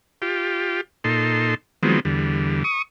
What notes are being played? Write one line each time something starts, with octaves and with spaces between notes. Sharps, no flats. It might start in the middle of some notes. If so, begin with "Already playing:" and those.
F4 G4
A#2 D#4 A4 C6
D#3 F3 F#3 G#3 B3 C4
E2 D3 G3
C#6 D#6